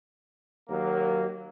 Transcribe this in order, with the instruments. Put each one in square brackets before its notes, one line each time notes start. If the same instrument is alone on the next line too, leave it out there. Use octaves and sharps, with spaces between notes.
[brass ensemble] D#2 F#3 A#3